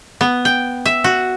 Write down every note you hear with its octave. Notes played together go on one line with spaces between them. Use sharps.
B3
G5
E5
F#4